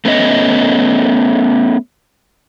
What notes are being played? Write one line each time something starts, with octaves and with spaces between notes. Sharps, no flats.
A3 B3 C#4 D#5